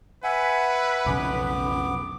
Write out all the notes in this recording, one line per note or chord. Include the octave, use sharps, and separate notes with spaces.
B4 E5 F#5 G#5
B1 F2 C#3 B3 D6